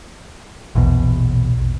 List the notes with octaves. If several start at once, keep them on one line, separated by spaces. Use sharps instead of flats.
A#1 E2 B2